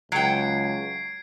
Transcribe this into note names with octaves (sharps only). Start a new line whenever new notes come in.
C#2 F#3 G5 G#6 C7 D7